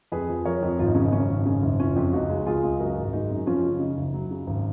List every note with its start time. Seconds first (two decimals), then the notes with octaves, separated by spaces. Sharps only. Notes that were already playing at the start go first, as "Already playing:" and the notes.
0.12 F2 G#4 B4
0.29 F3
0.45 F3 A#4 C#5
0.62 F2
0.79 G#1 F4
0.87 D#4
0.95 C#3 C#4
1.03 D#4
1.12 F#2 C#4
1.29 G#1
1.45 C#3 C#4
1.63 F#1
1.80 F#1 C#4 F4
1.96 F2
2.13 C#2 D#4 F#4
2.29 G#3
2.46 C#2 F4 G#4
2.63 C#2
2.80 F#2 F#4 A#4
2.97 G#1
3.13 G#3 D#4 F#4
3.30 F#2
3.46 F3 C#4 F4
3.64 C#3
3.80 C#3 D#4
3.97 F#1
4.14 F#3
4.31 C#3
4.47 G#1